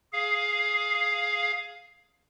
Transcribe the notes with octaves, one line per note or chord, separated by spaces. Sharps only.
G#4 F5